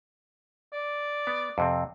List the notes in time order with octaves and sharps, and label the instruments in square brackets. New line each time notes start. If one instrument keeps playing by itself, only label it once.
[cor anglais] D5
[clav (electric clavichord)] B3
F2 C3 C4